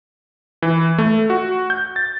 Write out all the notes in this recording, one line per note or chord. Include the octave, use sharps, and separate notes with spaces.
E3
A3
F#4
G6
A6